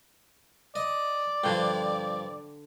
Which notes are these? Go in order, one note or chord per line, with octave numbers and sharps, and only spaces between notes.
D5 D#5
G2 D3 F3 G5